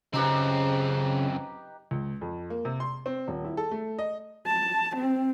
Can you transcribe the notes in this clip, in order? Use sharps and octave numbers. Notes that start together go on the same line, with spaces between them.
F#2 C#3 C4 D#4 G4 B4
C#2
F2
A#3
C3
C6
C4
D#1
E4
A4
A3
D#5
A5
C4